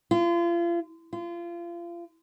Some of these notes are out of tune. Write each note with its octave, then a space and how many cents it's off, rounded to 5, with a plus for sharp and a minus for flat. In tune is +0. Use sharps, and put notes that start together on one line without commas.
F4 -35
F4 -30